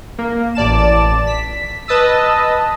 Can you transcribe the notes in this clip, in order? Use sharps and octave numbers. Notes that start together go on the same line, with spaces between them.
A#3
A1 D5 A5 E7
B6
B4 D#5 A5 D#6 E6